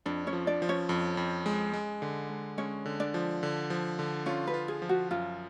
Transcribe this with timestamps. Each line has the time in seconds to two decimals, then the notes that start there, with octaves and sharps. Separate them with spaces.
0.06 F2 D4 D5
0.27 C#4 C#5
0.33 F3
0.47 D4 D5
0.62 F3
0.69 C#4 C#5
0.89 F2
1.17 F2
1.46 G#3
1.73 G#3
2.02 D3
2.30 G#3
2.58 G#3 C#4 C#5
2.86 D3
3.00 D4 D5
3.14 F3
3.43 D3
3.70 F3
3.99 D3
4.26 C#4 F4 C#5
4.47 B4
4.54 F4
4.68 G#4
4.82 F3
4.89 F#4
5.11 F#2 F4